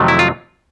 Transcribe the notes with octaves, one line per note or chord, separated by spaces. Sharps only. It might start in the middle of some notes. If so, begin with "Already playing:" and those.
Already playing: F2 C3 D#3 F#3 A3
E4
F4